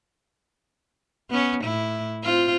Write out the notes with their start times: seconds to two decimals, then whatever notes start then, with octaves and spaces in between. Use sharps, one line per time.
1.30 B3 C#4
1.64 A2 E4
2.23 C4 F4